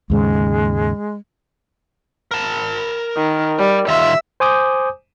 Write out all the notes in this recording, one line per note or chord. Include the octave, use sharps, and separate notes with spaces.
D#2 G#2 C#3 G#3
A#4 A5
D#3
G3
D#3 F4 E5
C5 G#5 D6 D#6 G6